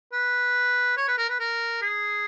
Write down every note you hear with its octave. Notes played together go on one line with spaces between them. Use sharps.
B4
C#5
B4
A#4
B4
A#4
G#4